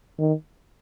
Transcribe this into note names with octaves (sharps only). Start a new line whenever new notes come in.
D#3